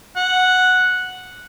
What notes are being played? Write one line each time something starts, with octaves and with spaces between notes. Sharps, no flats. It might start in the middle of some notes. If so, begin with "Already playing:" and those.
F#5